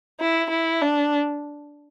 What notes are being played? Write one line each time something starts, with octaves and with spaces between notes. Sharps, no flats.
E4
E4
D4